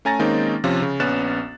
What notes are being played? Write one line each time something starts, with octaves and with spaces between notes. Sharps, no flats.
A3 C#4 G#5 A#5 A6 A#6
D#3 G#3 A#3 C4 C#4 D#4
C3 F3 C#4 F4
C#3
A#1 B3 C#4 F#6 A6 E7